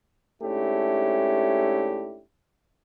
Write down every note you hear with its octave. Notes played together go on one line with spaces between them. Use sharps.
G#2 A3 C#4 D4 E4 G4